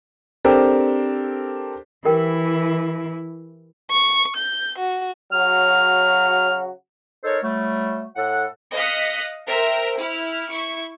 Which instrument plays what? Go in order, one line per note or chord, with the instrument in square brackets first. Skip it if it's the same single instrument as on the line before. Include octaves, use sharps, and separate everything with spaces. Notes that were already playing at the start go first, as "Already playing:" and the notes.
[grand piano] C4 D4 G4 A4 A#4 C5
[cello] E3 E4 [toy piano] G4 A#4 G5
[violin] C#6
G6
F#4
[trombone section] C#3 F#3 F#4 [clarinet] F6
[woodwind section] D#4 A4 A#4 C5 C#5
F#3 G3 A3
A2 A4 F#5
[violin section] D#5 F5 D#6 F#6 B6 C#7
A#4 C5 E5 G5
E4 F6
E4 C#6